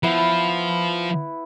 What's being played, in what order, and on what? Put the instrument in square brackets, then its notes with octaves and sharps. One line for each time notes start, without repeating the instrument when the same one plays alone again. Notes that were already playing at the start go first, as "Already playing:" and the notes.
[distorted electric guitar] F3 [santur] B3 E4 B4